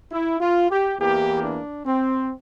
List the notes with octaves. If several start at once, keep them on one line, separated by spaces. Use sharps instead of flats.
E4
F4
G4
E2 E3 A#3 G4
D4
C4